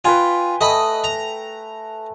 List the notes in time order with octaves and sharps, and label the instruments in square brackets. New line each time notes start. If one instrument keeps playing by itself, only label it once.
[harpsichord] F4 [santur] B4 G5 G#5
[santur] A3 [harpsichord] D#5 B5
[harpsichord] A#5